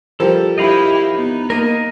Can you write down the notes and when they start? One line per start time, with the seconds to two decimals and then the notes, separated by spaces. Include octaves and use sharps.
0.20 F3 G3 F4 A4 A#4 C5
0.58 E4 G4 D#5 F5 B5
1.13 B3 D#4
1.50 A#3 A#4 D#5